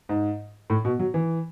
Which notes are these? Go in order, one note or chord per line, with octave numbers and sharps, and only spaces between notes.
G#2
A2
B2
F#3
E3